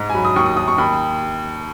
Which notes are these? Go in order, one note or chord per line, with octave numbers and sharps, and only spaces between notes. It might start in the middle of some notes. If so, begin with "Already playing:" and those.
Already playing: G#2
G#5
F#3 B5
D#6
D#2 C#6
D#6
D#2 D#6
C#6
D#2 B5